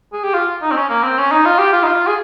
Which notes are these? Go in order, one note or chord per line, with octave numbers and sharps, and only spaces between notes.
G#4
G4
F4
D#4
C4
C#4
A#3
C4
C#4
D#4
F4
G4
F4
D#4
F4
G#4